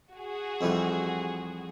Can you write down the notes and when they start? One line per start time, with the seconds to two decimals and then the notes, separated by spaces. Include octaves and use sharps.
0.14 F#4 G#4
0.61 F2 E3 G3